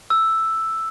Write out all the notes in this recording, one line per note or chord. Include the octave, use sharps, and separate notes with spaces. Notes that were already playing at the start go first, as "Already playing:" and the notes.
E6